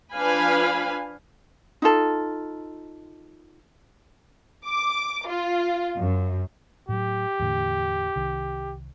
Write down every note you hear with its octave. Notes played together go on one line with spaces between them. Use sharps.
F3 D4 B4 F5 G#5 B5
D#4 F4 A4
D6
F4
F#2
A2 F#3 G4
E2 A2 D3
C2 D#3